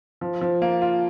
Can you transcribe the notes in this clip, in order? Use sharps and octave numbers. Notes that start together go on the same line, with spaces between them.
F3
F3
A#3
F4